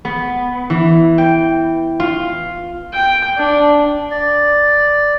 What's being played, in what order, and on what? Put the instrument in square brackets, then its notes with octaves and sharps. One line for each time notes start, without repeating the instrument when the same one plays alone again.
[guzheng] B3
E3
G5
F4
[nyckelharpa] G5
D4
[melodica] D5